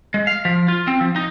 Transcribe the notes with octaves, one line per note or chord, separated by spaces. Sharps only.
G#3
F5
F3
F4
C4
F3
D#4